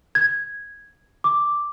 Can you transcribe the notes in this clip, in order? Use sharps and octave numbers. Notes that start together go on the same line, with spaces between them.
G#6
D6